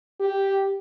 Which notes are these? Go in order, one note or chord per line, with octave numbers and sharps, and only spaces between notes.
G4